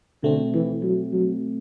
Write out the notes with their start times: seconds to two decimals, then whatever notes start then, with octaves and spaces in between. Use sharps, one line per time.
0.23 B2 D3 A3 C4
0.54 E3
0.83 F#3
1.13 F#3